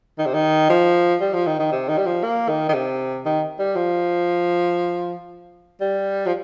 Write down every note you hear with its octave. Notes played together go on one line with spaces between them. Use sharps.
D#3
C3
D#3
F3
G3
F3
D#3
D#3
C3
D#3
G3
F3
A#3
D#3
D#3
C3
D#3
G3
F3
G3
F3